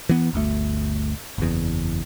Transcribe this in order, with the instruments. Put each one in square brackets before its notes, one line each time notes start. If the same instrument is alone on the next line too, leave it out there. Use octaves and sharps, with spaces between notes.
[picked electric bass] E3 B3
G1 D2 A3
F#1 E2